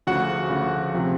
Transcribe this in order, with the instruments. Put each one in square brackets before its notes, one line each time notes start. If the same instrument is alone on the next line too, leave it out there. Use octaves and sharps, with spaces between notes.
[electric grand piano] D2 C#3 F3 F#4 F#5
D2 C#3 F3
C3 F3